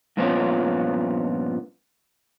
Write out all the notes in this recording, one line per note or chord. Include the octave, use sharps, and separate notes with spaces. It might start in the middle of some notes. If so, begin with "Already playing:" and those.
G2 A#2 F3 B3 C#4 F4